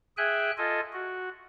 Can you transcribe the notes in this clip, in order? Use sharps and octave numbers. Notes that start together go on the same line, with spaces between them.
G#4 E5 G5 G#5 F#6
F4 A4 D#5 G#5
F#4